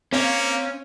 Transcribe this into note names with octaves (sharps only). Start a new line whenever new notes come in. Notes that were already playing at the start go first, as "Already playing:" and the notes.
A#3 C4 C#4 F5